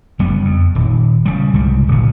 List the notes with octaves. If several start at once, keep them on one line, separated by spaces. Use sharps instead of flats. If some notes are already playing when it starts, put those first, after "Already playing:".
F#1 G3 B3
F2
D#1
C#3 G3
C2 G#2 C#3 G3
D1 A#2